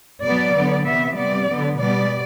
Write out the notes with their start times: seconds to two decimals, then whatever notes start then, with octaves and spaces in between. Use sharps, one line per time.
0.23 B2 F#3 B3 D5
0.55 D3 F#3 B3
0.85 C3 E3 B3 E5
1.16 C3 G3 B3 D5
1.48 D3 F#3 B3
1.79 B2 G3 B3 D5